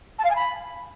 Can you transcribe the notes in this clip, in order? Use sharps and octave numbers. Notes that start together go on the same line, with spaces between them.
A5
F5
G#5
B5